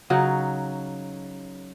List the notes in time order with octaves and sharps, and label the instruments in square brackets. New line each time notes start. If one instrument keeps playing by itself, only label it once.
[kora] C#3 F#3 D#4